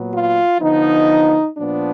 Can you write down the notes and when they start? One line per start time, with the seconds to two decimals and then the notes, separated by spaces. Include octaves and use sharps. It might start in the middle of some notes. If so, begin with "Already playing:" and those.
Already playing: A#2 F#3 B3
0.12 F4
0.60 D3 F3 B3 D#4
1.57 A#2 F3 B3 D4